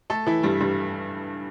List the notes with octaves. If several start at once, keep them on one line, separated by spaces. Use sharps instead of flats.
A3 A4
E3 E4
G2 G3
G2 G3